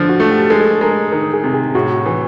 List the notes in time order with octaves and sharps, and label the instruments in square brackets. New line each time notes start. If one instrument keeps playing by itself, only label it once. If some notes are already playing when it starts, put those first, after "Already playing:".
Already playing: [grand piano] D3 F3
[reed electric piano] F#4
[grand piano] A3
[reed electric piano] G4
[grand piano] G#3 [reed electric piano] A4
[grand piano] G#3 [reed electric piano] A#4
[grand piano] D#3 [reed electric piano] A#4
[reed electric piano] G#4
[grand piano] C3
[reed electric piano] G#4
[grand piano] A2 [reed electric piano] F#4
[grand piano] E3